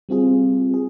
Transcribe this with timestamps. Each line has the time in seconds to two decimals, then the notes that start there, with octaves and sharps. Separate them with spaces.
0.09 G3 C4 F4 G#4
0.74 G#4